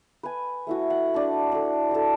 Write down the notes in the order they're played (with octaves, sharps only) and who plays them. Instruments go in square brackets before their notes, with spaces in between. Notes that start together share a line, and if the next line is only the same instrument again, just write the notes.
[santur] B4 G#5
A3 E4 F#4
F#5
D4 A5
D4 A4
F#4 A4